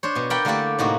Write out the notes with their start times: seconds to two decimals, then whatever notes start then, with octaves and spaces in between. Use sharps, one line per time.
0.03 D4 C5 C#5
0.15 B2 G#5
0.30 A#4 B4 D5 F#5 G5 B5
0.45 D3 A3 A#3 E4 G4 D5
0.79 A2 C3 A#3 D#4 F#4